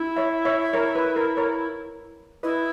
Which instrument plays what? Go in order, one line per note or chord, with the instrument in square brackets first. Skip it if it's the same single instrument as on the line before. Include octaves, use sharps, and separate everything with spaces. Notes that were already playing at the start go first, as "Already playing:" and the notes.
Already playing: [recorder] E4
[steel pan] C#5 E5
C#5 E5
A#4 C#5
B4
A#4
A#4 C#5
[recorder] E4 [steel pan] B4 D#5